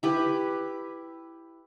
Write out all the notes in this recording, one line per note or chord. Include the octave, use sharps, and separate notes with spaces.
E4 G4 B4